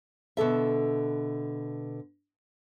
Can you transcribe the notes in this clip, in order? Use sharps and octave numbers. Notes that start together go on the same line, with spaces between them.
B2 D3 A4 E5